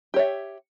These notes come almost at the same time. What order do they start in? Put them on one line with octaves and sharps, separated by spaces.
G4 C#5 E5